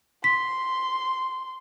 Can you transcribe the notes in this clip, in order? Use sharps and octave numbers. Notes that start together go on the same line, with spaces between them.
C6 B6